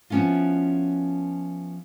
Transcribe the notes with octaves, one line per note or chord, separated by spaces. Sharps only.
F3 B3 C#4 E4 F4